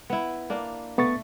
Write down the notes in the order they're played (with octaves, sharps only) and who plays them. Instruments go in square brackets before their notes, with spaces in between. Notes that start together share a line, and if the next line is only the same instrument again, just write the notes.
[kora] B3 E4
A#3 D4
[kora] A3 [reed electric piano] B3 C#6 A6